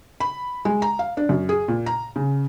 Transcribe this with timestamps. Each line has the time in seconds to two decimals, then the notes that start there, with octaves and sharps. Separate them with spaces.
0.20 B5
0.65 G#3
0.82 A#5
0.99 F5
1.17 D4
1.29 F#2
1.49 G#4
1.68 A#2
1.86 A#5
2.16 C#3